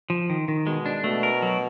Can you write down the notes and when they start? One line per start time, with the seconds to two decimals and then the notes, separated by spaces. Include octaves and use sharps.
0.10 F3
0.30 D#3
0.48 D#3
0.66 B2 G#3
0.86 D4
1.04 B2 A3
1.23 A#4
1.42 F#3